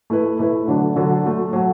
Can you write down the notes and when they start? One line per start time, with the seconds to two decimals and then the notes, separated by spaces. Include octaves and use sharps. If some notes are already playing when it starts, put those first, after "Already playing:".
0.10 A3 E4 B4
0.39 A3 E4 B4
0.67 D3 F#3 D4 A4
0.96 D3 F#3 D4 A4
1.24 F#3 A3 F#4
1.53 F#3 A3 F#4